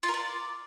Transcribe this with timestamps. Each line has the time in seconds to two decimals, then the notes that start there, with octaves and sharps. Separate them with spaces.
0.03 F4
0.08 A#4
0.14 D5